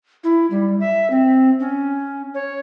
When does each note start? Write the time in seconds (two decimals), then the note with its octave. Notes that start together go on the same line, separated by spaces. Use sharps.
0.24 E4
0.51 G3
0.80 E5
1.10 C4
1.60 C#4
2.35 C#5